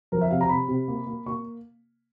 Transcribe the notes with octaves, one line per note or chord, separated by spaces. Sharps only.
F3 A#4
E5
C3 F5
A#5
C3 B5
C3
A#3
A#3
A#3 C#6